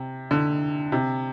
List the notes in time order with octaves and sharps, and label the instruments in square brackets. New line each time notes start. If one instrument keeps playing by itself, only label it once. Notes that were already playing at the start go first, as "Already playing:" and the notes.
Already playing: [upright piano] C3
D3
C3